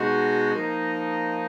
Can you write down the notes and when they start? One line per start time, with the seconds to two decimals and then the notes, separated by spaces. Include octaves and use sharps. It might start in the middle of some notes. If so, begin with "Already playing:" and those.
Already playing: B2 G#3 D#4 F#4
0.52 F3 A#3 D#4